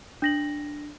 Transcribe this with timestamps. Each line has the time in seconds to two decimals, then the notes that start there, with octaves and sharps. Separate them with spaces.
0.22 D4 A#6 F#7